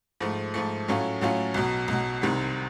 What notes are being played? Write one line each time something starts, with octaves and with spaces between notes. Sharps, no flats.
G#2 F3 A3
G#2 F3 A3
A2 F#3 A3 C#4 F4
A2 F#3 A3 C#4 F4
B1 B2 F#3
B1 B2 F#3
C2 C3 D#3 G3